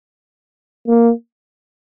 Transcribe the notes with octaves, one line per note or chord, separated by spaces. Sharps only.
A#3